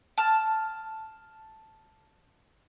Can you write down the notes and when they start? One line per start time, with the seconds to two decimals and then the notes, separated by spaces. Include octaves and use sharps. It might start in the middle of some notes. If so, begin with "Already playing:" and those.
0.18 A5 F6